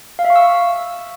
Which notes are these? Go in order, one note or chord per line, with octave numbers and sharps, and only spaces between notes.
F5
E5
C#6
E6